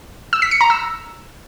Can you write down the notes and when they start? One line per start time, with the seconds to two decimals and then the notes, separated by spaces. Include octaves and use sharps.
0.33 E6
0.42 B6
0.51 C#7
0.61 A#5
0.70 E6